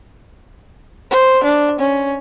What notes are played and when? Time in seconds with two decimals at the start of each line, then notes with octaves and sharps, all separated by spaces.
1.11 C5
1.44 D4
1.79 C#4